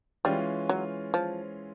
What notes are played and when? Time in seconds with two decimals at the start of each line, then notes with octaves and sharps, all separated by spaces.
0.25 E3 G3 G#3 C#4 F4
0.69 F#3
1.14 F3